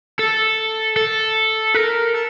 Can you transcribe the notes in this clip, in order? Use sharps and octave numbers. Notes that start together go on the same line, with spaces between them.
A4
A4
A#4
A4